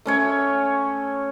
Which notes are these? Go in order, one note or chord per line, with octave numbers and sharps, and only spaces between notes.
A3 C#4 C#5